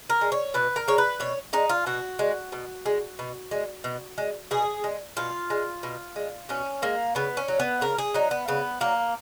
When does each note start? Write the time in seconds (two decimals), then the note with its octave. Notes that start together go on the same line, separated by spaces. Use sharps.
0.10 A#4
0.21 G#3
0.32 C#5
0.54 B2 B4
0.76 A#4
0.88 G#3 C#5
0.98 B4
1.20 B2 C#5
1.53 G#3 D#4
1.69 F4
1.86 B2 F#4
2.19 G#3
2.52 B2
2.86 G#3
3.19 B2
3.51 G#3
3.84 B2
4.18 G#3
4.51 B2 G#4
4.84 G#3
5.17 B2 F4
5.50 G#3
5.83 B2
6.16 G#3
6.49 B2 C#4
6.82 G#3 A#3
7.15 C#3 B3
7.37 C#4
7.48 F#3
7.60 B3
7.81 C#3 A#4
7.98 G#4
8.14 F#3 D#4
8.31 B3
8.48 C#3 B3
8.81 F#3 A#3